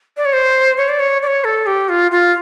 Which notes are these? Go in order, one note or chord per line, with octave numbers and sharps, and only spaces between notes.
D5
C#5
C5
C#5
D5
C#5
D5
C#5
A4
G4
F4
F4